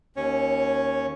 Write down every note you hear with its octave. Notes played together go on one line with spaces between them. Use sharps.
D#2 C#4 C#5